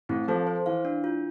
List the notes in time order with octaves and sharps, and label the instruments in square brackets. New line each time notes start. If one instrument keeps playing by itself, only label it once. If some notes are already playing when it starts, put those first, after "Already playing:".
[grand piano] A2 [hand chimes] C4
[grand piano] F3 [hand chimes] A4
[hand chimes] C5
[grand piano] E3 [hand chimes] F5
[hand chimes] D4
F4